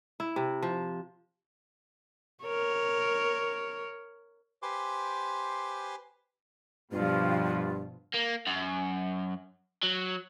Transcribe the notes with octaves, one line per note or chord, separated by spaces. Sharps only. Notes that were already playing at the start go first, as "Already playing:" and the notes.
E4
C3
F3
A#4 C#5
G4 B4 C5 G#5 C6 D6
G2 B2 F3 F4
A#3
F#2
F#3